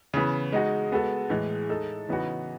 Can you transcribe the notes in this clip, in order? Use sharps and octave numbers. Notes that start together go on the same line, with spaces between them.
C#3 E3 B3
G#3 D#4 F#4
G#3 B3 F#4 A4
A2 E3 G#3
G#3 D#4 A4
C#3 E3 B3 D#4 F#4